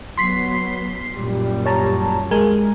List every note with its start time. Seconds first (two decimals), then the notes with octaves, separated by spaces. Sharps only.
0.17 F#3 B3 C6 B6 C7
1.17 F#2 A#2 G3
1.66 C#5 A5 A#5
2.31 G#3 A#4 G#5